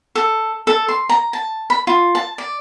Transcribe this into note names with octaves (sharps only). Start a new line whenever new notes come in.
A4
A4
C6
A#5
A5
B5
F4
A5
D5